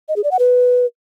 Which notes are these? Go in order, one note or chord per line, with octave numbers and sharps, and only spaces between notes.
D#5
G#4
D5
F#5
B4